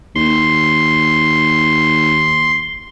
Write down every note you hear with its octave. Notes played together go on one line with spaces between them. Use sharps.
D#2 C6